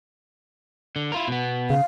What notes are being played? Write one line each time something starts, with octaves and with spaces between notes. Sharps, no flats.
D3
E4 F4 A#4
B2 B3
C#3 F5